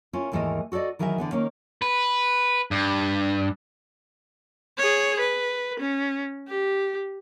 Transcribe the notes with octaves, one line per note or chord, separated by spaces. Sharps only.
C#4 E4 F4 A#4
D#2 G#2 E3 A3 A#4 D#5
F#4 A4 C5 D5 D#5
D#3 E3 F#3 G#4 A#4 E5
D3 E3 B3
D#3 A#3 C#4
B4
G2
G#4 C#5
B4
C#4
G4